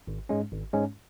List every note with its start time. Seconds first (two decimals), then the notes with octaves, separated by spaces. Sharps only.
0.07 G#1
0.29 G#2 G#3 C#4
0.52 G#1
0.73 G#2 G#3 C#4